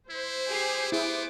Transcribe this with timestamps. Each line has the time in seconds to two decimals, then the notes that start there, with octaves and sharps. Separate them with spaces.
0.10 E4 C5
0.48 G4 G#4 C7
0.92 B3 E4 G#4 D6